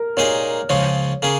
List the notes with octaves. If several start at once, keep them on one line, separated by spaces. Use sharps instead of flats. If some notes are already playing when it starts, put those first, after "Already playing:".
Already playing: A#4
A#2 A#3 D#4 G#4 C#5 D#5
C#2 C#3 F3 C#4 F4 C#5
C#3 A#3 C#4 G#4